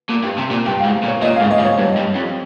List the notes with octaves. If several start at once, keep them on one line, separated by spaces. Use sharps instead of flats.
A#2
G2
C3
A#2
G2 G5
F5
G#2
A#2
C#5
A#2 D#5
F5
G#2
D#5
G#2
C#5
G2
G2
F2